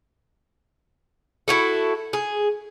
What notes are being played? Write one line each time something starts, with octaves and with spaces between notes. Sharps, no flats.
E4 F#4 A4
G#4